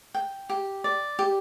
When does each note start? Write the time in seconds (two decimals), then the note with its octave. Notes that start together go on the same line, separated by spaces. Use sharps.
0.14 G5
0.49 G4
0.84 D5
1.19 G4